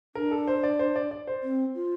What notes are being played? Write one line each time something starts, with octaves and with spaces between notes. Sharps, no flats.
D4 A#4
A4
C5
D5
C5
D5
D5
C5
C4
F4